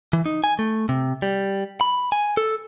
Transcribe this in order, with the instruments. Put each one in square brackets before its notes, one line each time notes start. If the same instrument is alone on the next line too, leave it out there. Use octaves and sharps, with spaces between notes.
[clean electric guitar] E3
D#4
G#5
A3
C3
G3
B5
G#5
A4